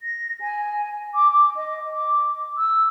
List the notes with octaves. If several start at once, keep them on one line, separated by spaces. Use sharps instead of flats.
A#6
G#5
D6
D6
D#5
D6
E6